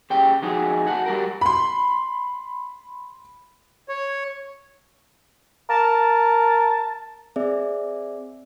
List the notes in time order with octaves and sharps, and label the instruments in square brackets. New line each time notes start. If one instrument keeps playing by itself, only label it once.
[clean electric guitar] C#3 G3 G5
F2 G#3 D#4 F#4 G#4
F#4 A4 F#5
G3 F#4 A#4
[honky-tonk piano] B5 C6
[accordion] C#5
[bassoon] A#4 [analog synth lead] A5
[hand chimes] C4 G#4 D5 E5